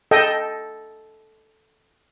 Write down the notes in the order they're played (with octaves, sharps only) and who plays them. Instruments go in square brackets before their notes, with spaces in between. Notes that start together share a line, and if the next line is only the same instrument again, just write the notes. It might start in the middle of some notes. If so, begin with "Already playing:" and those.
[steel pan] A4 D#5 G5